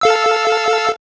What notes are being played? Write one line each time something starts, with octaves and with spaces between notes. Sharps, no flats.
A4 F5 E6